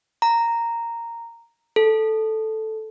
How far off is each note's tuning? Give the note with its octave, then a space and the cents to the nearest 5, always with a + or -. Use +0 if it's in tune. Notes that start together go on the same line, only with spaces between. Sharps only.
A#5 -5
A4 -5